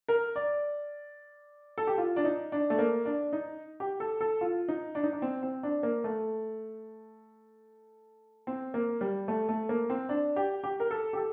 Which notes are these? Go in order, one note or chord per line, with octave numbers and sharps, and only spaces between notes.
A#4
D5
A4
G4
F4
D4
D#4
D4
A3
A#3
D4
D#4
G4
A4
A4
F4
D#4
D4
D#4
D4
C4
C4
D4
A#3
A3
C4
A#3
G3
A3
A3
A#3
C4
D4
G4
G4
A#4
A4
G4
A4